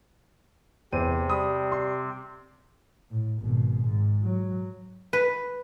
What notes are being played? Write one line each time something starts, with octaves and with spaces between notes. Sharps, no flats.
E2 C3 C4 C5 D#7
G3 B5 D#6
C6
A2
G#1 B2
G#2
F#3
B4